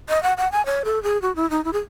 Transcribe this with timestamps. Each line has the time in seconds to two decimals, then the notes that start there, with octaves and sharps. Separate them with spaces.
0.09 D#5
0.23 F#5
0.38 F#5
0.52 G#5
0.66 C#5
0.85 A4
1.03 G#4
1.22 F#4
1.36 E4
1.50 D#4
1.64 E4
1.73 G#4